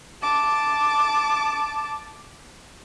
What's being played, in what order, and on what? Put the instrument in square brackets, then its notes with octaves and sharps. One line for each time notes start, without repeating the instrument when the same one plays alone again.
[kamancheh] A5 D6